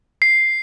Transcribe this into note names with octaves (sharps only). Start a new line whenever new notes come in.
C7